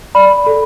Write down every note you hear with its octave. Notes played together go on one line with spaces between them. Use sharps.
D5 B5
A4